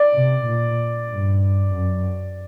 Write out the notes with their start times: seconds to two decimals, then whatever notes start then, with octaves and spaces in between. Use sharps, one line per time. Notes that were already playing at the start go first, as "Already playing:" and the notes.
Already playing: D5
0.13 C3
0.46 A#2
1.10 G2
1.73 F#2